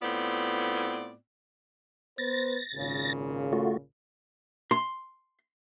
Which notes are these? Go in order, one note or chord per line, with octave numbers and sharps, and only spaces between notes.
A2 B3 C4 F4 D5
B3 B4 C5 A6 A#6
G#1 A#2 C#3
A3 F4 F#4
C6